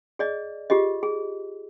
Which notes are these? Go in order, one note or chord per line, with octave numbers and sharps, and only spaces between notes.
G#4 D5 D#5
F4 G4 G#4 D#5
G#4